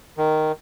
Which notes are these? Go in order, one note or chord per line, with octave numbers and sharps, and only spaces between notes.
D#3